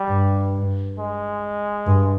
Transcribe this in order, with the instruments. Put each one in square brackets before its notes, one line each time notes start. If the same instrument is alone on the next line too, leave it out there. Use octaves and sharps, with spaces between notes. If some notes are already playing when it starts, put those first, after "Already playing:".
Already playing: [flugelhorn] G3
[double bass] G2
[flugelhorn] G#3
[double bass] G2